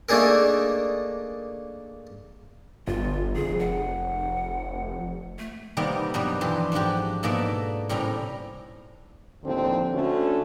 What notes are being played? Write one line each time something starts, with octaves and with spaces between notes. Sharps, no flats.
A3 A#3 D4 D#4 G#4 A#4
G1 F4
F1 G#4
F#5
A3
C3 D#3 G3 A#3 B3
G2 B2 F#3 G3
F2 E3 G4 C6
G#2 F3 D4 F#4 G4
G#2 B2 A#3 A4 D5 E5
A2 C3 G3 C#4 A#5
D#2 A2 D3 F3 C4
D3 A3 C#4 F#4 A4